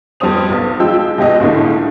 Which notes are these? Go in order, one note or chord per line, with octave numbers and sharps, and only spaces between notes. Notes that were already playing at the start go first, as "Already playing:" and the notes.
F2 G3 B3 C5 D#6 F7
B1 B3
F3 G#3 G5 E6
B2 G#3 G4 D#5
C#2 A2 D3 A#3